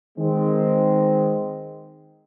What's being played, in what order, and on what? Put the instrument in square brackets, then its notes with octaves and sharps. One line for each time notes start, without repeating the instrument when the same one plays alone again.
[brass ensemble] D#3 G#3 C4